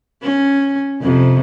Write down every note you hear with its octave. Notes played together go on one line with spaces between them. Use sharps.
C#4
F2 C3